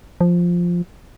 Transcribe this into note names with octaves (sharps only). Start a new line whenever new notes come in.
F3